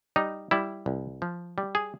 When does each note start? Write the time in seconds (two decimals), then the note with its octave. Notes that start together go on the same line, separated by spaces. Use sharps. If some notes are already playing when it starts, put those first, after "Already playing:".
0.16 G3 D#4
0.51 G3 E4
0.86 C2
1.22 F3
1.58 G3
1.75 G#4